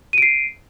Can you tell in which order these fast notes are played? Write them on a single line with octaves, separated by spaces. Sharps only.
D#7 D7 C7